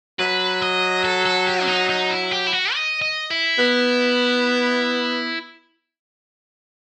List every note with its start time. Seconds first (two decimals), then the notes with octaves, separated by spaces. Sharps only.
0.19 F#3 B4
0.62 D#5
1.04 A4
1.26 A4
1.47 G4
1.64 C4
1.68 D#4
1.89 D#4
2.10 E4
2.31 G4
2.47 E4
2.53 F#4
2.74 D#5
3.02 D#5
3.31 E4
3.58 B3